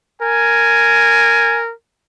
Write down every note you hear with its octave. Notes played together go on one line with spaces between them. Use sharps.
A#4 G#5